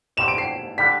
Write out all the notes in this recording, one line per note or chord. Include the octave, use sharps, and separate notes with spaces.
B2 G3 C4 G4 E7
D7
C7
D3 G3 D4 G4 B4 B6